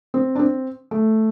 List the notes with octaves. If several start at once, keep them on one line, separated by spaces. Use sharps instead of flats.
C4
D4
C4
A3